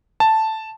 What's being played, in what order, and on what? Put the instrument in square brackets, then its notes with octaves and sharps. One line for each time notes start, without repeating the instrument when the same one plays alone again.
[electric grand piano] A5